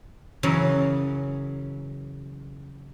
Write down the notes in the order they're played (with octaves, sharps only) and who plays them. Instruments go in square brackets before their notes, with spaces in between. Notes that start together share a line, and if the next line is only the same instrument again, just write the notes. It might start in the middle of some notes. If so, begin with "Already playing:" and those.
[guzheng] F#2 C#3 E3 F#3